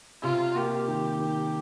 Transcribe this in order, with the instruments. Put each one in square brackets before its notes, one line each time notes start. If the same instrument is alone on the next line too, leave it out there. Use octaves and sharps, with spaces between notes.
[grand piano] C3 [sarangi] F4
[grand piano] A#3 [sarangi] G4
[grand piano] D#3
D#3